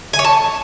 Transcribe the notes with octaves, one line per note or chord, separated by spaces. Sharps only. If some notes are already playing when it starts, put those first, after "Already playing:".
G#5
C#5
A5